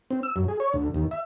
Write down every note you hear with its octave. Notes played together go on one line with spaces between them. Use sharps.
C4
E6
F#2
G#4
C#5
D2
D#2
E5